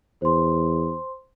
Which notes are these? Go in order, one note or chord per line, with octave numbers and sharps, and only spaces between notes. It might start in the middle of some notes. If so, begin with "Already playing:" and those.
E2 C5 C6